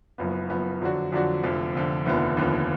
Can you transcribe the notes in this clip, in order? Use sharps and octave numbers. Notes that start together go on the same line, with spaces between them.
F#1 F#2 F3 B3
F#1 F#2 F3 B3
F2 D3 F#3 D4 F#4
F2 D3 F#3 D4 F#4
F1 F2 D3 F3
F1 F2 D3 F3
F1 D#2 D3 F3 B3
F1 D#2 D3 F3 B3